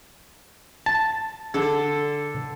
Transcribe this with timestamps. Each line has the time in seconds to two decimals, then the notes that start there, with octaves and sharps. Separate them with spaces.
0.86 A5
1.54 D3 A4